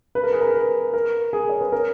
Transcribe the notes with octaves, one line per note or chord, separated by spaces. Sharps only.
B4
A#4
G#4
A#4
B4
A#4
G#4
C#5
B4
A#4